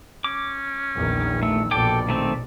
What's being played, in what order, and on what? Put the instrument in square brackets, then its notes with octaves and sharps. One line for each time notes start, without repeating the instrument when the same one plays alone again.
[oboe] C#4 [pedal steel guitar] D6
[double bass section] A#1 E2 D#3
[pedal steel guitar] A3 [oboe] E6
[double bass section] A#1 B2 [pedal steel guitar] A4 G5 D6 [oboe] D5
[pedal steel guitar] D#3 A3 C4